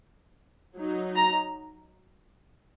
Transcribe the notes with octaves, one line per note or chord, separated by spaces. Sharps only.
F#3 D#4
A#5